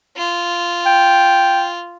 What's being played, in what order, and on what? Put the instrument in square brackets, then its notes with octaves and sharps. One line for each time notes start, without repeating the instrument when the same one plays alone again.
[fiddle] F4
[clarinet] G5